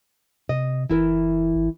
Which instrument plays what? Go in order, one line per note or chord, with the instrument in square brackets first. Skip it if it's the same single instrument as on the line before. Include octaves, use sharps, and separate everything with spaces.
[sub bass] C3 [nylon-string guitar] D#5
[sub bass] F#1 [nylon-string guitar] E3 E4 A#4
[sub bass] G#1